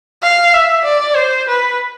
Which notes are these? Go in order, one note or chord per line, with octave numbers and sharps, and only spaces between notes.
F5
E5
D5
C5
B4